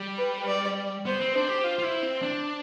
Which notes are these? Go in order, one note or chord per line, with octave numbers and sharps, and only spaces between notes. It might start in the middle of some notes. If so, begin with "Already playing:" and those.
Already playing: G3
B4
D5
B3 C5
C4
D4 C5
G4
F4
F4
E4
C4
D4